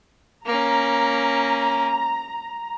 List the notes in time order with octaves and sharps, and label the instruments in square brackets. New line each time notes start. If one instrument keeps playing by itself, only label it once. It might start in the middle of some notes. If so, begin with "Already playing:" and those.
[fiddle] A#3 C#4 [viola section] A#5